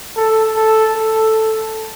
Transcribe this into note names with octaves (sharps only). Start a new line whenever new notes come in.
A4
A4
A4